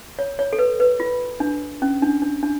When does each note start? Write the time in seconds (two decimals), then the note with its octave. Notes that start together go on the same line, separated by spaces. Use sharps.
0.19 C#5
0.39 C#5
0.53 A4
0.59 B4
0.80 B4
1.00 F4
1.40 D4
1.82 C#4
2.02 D4
2.22 D4
2.43 D4